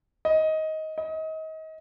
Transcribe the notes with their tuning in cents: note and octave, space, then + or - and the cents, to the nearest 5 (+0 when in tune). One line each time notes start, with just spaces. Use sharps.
D#5 +15
D#5 +30